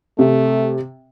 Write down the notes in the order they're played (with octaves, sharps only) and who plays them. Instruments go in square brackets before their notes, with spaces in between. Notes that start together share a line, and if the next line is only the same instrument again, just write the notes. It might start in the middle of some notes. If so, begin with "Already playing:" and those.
[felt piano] C3 [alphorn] A3